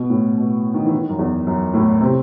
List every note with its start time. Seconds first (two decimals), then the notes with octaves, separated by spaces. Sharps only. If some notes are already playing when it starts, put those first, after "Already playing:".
Already playing: B2
0.10 A2
0.38 B2
0.74 D#3
0.85 E3
0.92 D#3
1.09 F#2
1.19 E2
1.47 F#2
1.74 A2
2.01 C3